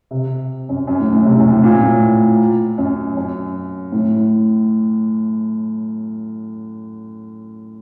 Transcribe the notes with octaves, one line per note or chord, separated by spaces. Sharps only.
C3
F#2
F#2
A2
A2
C3
F#2
A2
A#2
A2
F#2
F#2
A2